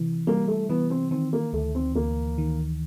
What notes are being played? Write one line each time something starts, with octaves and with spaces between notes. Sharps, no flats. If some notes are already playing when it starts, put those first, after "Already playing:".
Already playing: C3 E3
G3 A#3
A3
E3 B3
C4
D#3 C4
A#3
D2 A3
C4
D2 A#3
D#3